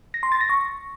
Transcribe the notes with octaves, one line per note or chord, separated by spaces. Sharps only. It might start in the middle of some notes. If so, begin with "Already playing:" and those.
A#6
C6
A6
A#6
C#6